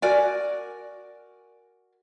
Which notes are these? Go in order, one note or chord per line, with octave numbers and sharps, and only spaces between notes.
F#4 A#4 D5 G#5